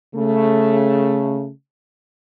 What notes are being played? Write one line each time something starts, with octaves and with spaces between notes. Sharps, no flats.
C#3 A3